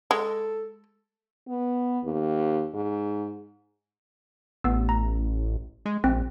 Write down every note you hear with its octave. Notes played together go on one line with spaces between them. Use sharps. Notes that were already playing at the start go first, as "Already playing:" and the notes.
G#3 A4
B3
D#2
G#2
A1 B3 E6
A#5
G#3
A#1 C4 G5